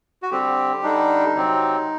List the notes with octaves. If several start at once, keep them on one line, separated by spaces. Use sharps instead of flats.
F#4
D3 G3 C4 G4
D3 G3 D4 D#4
C3 F#3 C4